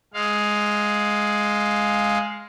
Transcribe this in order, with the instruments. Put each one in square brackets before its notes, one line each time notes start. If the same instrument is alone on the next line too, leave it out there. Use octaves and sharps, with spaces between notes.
[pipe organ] G#3 F5